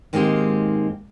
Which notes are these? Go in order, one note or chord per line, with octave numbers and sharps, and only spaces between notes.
G#2 D#3 G#3 A#3 C4 G4